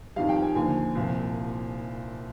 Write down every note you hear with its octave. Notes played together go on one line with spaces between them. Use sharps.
F2 D#3 G3 F5
G5
G#5
D#2 D3 F3 G#5
C2 A#2 F3